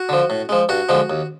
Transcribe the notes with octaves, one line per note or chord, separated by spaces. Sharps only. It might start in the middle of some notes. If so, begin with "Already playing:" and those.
Already playing: F#4
D3 F3
A2
F3 G#3
G2 F#4
D3 F3 G#3
D#2